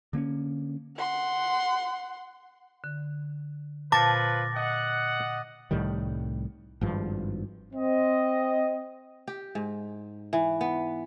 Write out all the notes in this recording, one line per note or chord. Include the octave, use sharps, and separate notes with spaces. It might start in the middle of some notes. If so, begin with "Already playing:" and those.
D3 A#3 B3 C#4
F#5 C6
D3
A#2 F3 B4 A5 D6 A6 A#6
D#5 F#5
C2 A2 D#3 G3
G#1 G2 F3
C4 D#5
G4
G#2
E3
B3